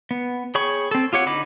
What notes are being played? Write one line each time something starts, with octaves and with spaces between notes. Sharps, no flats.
B3
G#4 C#5 G5 B5 C#6
C4 A4
F4 G4 C#5 F#5
D3 D#4 B5 D6